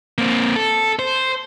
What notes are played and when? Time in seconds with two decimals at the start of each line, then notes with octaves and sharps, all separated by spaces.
0.18 A#3 C4
0.56 A4
0.99 C5